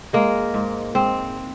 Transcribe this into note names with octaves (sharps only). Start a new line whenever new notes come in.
G#3 A#3
G#2
G#2 C4